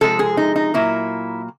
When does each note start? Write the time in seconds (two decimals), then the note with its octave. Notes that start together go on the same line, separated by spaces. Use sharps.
0.01 C3 F3 G#3 A4
0.19 G#4
0.37 D#4
0.56 D#4
0.74 A#2 F#3 A#3 E4